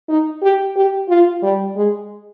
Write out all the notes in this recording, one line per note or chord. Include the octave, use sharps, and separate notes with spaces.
D#4
G4
G4
F4
G3
G#3